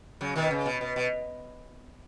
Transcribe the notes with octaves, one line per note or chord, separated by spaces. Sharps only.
C#3 F#3
B2 D#3
C#3
B2
B2
B2